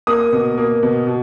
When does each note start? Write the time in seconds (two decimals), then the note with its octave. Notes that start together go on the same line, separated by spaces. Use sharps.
0.07 A#3 D#6
0.32 B2
0.58 A#3
0.83 B2
1.07 B2